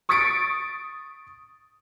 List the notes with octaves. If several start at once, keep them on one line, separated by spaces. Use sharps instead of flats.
C#6 D#6 A6 B6 C#7 D7